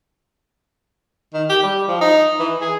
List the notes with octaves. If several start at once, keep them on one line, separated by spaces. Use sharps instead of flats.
D#3
G4
G3
F3
D#4
E3
G#4